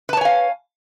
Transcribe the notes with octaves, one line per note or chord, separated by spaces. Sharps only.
B4 C#5 F5 G#5 A5